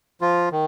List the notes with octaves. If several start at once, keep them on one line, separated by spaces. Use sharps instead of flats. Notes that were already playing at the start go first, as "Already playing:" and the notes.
F3 F4
D#3